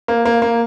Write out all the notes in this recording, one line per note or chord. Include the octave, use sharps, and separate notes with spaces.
A#3
A#3
A#3